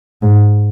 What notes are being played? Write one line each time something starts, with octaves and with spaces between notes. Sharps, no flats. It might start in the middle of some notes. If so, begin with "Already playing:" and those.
G#2